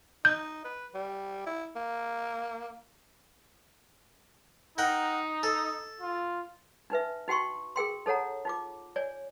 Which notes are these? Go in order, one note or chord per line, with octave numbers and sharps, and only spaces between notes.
D#4 G6
B4
G3
E4
A#3
D#4 A#4 F#5 G5
A4
F4
D4 D#4 B4 E5
D#4 F#4 G5 C6 C#6
G#4 A#4 G5 C6
D#4 A4 C#5 F#5 A#5
D#4 F4 D6
C#5 D5 G#5